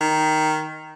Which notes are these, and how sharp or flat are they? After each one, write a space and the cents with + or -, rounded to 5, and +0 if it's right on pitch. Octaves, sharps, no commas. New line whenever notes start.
D#3 +0